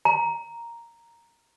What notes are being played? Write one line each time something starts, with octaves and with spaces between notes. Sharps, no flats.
A#5